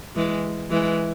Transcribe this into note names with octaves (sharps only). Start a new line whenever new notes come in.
E3 G#3
E3 G#3